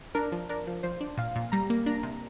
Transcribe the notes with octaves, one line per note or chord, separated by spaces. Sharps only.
D4 A#4
F3
D4 A#4
F3
F3 C5
D4
A#2 F5
A#2
G3 A#5
A#3
D4 A#5
C3